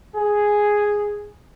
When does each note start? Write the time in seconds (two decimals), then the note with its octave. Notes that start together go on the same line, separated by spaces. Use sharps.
0.14 G#4